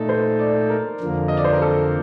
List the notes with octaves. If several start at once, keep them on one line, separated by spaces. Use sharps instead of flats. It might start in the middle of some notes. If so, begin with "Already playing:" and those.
Already playing: A#2 A3 D#4 A4 D5
C5
D5
A#4
F2 D3 F3 A#3
D#5
D5
C5
A#4
A4